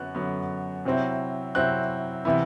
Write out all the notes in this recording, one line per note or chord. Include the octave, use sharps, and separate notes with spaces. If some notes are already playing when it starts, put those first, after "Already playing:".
Already playing: F#2 D3 F#3 B3 F#6
F#2 D3 F#3 B3
C3 F#3 C4 E4
C3 F#3 C4 E4 F#6
C3 E3 B3 E4